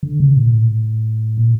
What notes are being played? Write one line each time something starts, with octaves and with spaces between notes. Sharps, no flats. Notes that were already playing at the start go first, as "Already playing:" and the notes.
D3
C#3
A#2
A2
A#2